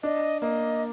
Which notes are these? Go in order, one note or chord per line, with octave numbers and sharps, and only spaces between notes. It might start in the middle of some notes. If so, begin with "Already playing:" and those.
D4 D#5
A#3 D#5